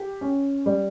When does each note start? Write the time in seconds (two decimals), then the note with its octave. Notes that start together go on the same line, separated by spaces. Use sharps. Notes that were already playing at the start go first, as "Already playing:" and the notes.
Already playing: G4
0.21 C#4
0.66 G3